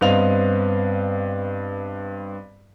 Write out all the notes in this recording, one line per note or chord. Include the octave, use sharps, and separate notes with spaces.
G2 B3 C4 D#5 F5 F7